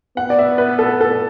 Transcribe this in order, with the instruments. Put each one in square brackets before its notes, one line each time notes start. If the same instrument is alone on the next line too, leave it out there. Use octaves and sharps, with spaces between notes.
[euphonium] B3 [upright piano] F#5
[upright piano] D5
E5
B4
A4
A4